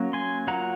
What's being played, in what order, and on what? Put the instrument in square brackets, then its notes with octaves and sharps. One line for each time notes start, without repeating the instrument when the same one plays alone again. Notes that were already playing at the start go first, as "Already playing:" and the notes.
Already playing: [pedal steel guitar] F#3 A#3 C#4
G#5 C6
F#3 A#3 F4 F#5 A#5